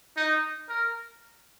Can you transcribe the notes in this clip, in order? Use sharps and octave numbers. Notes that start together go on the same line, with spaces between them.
D#4
A#4